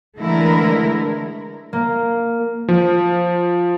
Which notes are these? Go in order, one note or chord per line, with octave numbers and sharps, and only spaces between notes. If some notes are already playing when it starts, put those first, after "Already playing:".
D3 E3 G#3 A3 E4 A#4
A#3
F3